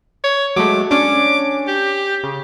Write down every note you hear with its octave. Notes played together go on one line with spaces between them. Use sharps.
C#5
F#3 G#3 A3 D6
C#4 D4 D6
G4
C#3